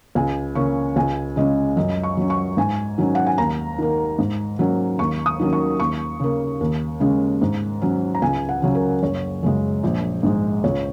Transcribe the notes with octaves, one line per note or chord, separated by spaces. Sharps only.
C#2 G#5
C#3 A#3 C#4 C#6
C#2 G#5
C#3 G#3 C#4 D#5
F#2 D#5
C#6
F#3 C#4
C#6
G#2 G#5
D#3 F#3 C#4
F#5
G#5
D#2 A#5
D#3 A#3
G#2
F#3 A#3 C#4
D#2 C#6
D#6
D#3 F#3 A#3 C#4
C#6
D#2 C#6
C#3 A#3
D#2
C#3 G#3 C#4
G#2
F#3 C#4
A#5
C#2 G#5
F#5
C#3 F#3 C#4
A#4
F#1 C#5
F#2 C#3 G#3
A#1
G#2 G#3
C#2 C#5